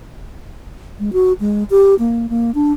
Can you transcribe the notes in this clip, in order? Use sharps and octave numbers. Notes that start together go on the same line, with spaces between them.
G#3
F#4
G#3
G4
A#3
A#3
D4